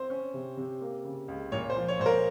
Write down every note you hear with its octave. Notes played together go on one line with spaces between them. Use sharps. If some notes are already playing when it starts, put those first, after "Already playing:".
Already playing: C4 C5
C#4
C3
C3
A#3
C#3
C#2
A#2 C#5
C5
F3
C#5
A#2 C5
A#4